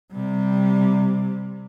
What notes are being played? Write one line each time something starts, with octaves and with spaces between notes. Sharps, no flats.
C3 G3